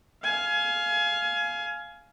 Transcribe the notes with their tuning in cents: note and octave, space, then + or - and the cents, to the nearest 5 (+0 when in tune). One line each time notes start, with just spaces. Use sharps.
F5 +0 G#5 +25